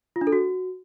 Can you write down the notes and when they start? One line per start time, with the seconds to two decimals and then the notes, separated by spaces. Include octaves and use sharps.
0.16 F4
0.21 D4
0.27 A4
0.32 F#4